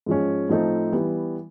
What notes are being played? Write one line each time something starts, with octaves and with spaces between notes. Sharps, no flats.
G#2 F3 G#3 C#4
A2 F3 A3 C4 D#4
E3 G3 B3